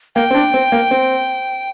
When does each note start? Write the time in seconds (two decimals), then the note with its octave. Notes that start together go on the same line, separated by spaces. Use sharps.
0.15 A#3 G5
0.31 C4
0.35 D4
0.54 C4
0.72 A#3
0.91 C4